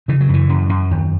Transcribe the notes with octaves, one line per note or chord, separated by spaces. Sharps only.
C#3 E3
F#3
F#2 E3
F#2
F#2
D#2